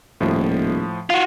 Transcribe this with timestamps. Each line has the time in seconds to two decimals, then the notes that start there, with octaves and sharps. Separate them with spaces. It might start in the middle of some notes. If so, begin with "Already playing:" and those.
0.21 D#1 A2 F3
1.10 F4 F#4